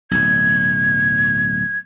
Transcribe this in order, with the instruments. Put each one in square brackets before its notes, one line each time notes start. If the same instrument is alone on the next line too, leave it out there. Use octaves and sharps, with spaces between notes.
[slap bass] D1 B1 [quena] G#6